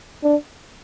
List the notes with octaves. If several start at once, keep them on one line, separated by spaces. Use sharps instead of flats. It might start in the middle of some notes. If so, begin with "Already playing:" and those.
D4